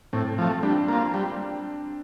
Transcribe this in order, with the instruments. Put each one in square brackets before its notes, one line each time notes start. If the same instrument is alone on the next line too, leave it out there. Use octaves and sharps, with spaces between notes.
[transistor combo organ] A2 [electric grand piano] C4
[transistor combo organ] F3 A3
[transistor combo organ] G3 [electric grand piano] D4
[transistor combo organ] A#3 F4
G3